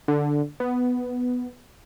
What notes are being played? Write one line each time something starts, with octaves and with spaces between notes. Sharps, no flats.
D3
B3